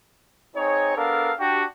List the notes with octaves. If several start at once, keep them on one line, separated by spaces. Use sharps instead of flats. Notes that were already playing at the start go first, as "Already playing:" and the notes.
C4 D#4 G#4 C#5
B3 D4 A4 A#4 F5
D4 F#4 G4